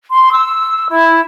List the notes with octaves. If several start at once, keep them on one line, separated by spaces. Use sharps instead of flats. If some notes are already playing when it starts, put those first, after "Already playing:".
C6
E6
E4